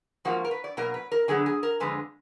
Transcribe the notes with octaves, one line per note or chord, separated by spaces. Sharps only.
G#2 F3 A#3 F#4
A#4
B4
D5
B2 F#3 A#3 A#4
B4
A#4
D3 F#3 B3 G#4
G#4
A#4
F2 D3 G#3 B4